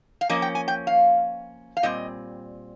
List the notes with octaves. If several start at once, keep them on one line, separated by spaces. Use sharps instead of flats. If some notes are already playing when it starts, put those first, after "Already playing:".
F5
F3 A#3 C#4 D#5
G5
G#5
G5
F5
F5
A#2 G3 C4 D#5